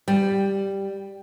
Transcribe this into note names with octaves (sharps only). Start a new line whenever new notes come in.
G3